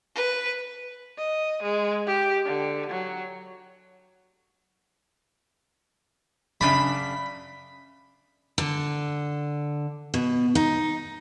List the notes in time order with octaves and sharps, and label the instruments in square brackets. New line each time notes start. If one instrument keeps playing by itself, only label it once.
[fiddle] B4
[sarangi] D#5
G#3
G4
D3
F#3
[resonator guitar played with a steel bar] F#2 C#3 D4 [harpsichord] B5
[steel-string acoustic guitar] D3
B2
D#4